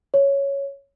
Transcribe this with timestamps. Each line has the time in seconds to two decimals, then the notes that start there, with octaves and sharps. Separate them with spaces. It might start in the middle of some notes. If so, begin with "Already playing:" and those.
0.14 C#5